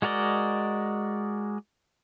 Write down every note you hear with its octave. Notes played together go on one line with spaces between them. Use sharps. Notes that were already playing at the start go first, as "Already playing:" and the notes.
G#3 F#4 A#4 D5 D#5